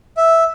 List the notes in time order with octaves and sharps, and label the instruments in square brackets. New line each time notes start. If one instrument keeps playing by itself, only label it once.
[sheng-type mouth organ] E5